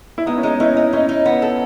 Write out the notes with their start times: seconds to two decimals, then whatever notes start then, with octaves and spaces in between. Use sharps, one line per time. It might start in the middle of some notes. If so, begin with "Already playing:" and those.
0.18 E4
0.26 G#3 B3 D#4
0.38 C#4
0.43 G#3 B3 D#4
0.60 C#4 D#4 E4
0.77 D#4
0.93 C#4 D#4 E4
1.09 D#4
1.25 B3
1.42 A4